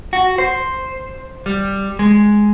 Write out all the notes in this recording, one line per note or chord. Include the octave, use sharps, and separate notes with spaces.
F#4
C5
G3
G#3